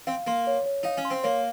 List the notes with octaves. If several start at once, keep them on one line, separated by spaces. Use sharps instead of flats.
C4 F5
A#3 C6
C#5
C#5
D#4 F5
C#4
C6
C4
A#3 C#5